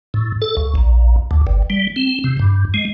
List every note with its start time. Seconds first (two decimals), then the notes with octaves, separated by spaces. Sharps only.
0.14 A2
0.42 A4
0.57 C#2
0.75 A#1
1.31 D2
1.47 G1
1.70 G3
1.96 C4
2.24 C3
2.39 G2
2.74 G#3